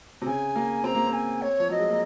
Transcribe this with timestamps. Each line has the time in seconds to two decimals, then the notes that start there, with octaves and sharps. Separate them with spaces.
0.22 C3
0.26 C#3 G#5
0.56 A#3
0.84 C4 A#5
0.95 A#3
1.07 C4
1.13 G#5
1.41 C#5
1.60 F3
1.69 F#3 D#5
1.79 G#3
1.90 A#3